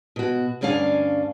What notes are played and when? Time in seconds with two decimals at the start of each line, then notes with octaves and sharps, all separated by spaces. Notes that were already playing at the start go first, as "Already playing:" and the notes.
0.16 B2 F#4
0.61 D2 G2 C#4 D4 F5 G#5